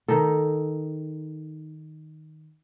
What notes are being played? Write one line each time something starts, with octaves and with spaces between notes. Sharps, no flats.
D#3 D#4 A4